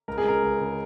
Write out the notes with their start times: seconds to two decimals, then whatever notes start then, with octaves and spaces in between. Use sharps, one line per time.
0.08 C#2 A#4
0.18 G#4
0.24 C#3 G#3 A#4
0.42 C#2
0.61 C#3 G#3